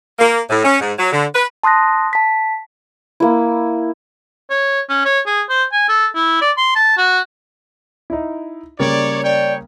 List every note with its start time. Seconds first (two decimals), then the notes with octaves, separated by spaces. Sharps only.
0.19 A#3
0.50 A2
0.64 C#4
0.80 G#2
0.99 F#3
1.12 D3
1.34 B4
1.63 A5 C6 D#6 F#6 A#6
2.13 A5 B6
3.20 A#3 E4
4.50 C#5
4.89 C#4
5.05 C#5
5.27 G#4
5.49 C5
5.72 G#5
5.89 A4
6.15 E4
6.41 D5
6.57 C6
6.75 A5
6.97 F#4
8.10 D#4 E4
8.79 C#3 G3 A#3 C#5 D5
9.23 C#5 D5 G5